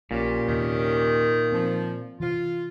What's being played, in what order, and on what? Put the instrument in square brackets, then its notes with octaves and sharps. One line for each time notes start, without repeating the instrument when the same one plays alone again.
[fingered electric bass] A#1 [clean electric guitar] A#2 [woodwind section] C#4 G4
[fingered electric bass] D#2 C3 [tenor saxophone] D#3
[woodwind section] F3 [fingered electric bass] C4
[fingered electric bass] C3 E3 [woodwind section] F4